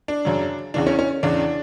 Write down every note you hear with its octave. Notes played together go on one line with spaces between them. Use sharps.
D4
F#2 C#3 F#3
E2 C#3 E3 D4
C#4
C#4
E2 C#3 E3 D4